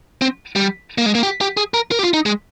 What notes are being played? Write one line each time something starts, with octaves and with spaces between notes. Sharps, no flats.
C4
G3
A#3
G#3
A#3
G4
G4
G#4
A#4
A#4
G4
F4
D#4
G#3